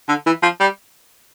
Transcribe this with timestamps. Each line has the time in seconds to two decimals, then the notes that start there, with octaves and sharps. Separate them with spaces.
0.09 D3
0.26 E3
0.43 F3
0.60 G3